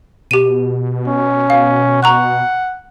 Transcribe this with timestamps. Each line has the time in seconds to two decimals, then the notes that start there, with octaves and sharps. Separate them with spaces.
0.31 B2 G4 D#7
1.08 C#4
1.50 F5
2.03 F#5 A#5 C#6 F#6